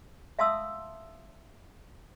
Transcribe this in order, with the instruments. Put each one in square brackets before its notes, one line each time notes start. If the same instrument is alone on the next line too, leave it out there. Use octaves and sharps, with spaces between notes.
[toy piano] E5 F5 A5 C6 D#6 E6